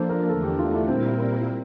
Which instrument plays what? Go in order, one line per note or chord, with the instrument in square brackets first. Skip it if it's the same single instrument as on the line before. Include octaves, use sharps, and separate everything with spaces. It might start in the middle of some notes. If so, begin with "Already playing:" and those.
Already playing: [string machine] F3 A#3 D4 [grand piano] A4 C5
[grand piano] A#4
[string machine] E2 D3 A3 D4 [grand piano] A4
[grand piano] G4
F4
E4
[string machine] A#2 G3 A#3 E4 A#4 [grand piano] C4
[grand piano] C4